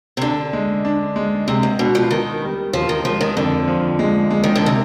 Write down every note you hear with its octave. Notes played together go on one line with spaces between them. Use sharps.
C3
D3 D4
G#3
D4
G#3
C3 G#3
G#2
B2 D4
F3
D#3 B3
G3
D#2 F3
D#3
F3 G#3
D#3
F2 D3
F3
G#3
G#3
D#3
D3
C3 D#3